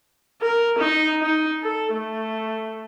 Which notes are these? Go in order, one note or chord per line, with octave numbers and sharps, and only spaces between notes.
A#4
D#4
D#4
A4
A3